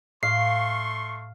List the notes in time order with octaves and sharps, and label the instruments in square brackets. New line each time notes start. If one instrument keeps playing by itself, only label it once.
[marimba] A2 [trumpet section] A3 C6 C#6 [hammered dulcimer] F5 [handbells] C7